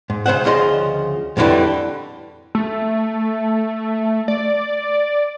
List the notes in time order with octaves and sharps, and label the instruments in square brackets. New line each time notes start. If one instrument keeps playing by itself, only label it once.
[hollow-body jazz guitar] G#2
C#3 C5 E5 F#5
D2 C#3 F3 D#5 C6
F2 A2 D3 E3 G3
[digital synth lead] A3
D5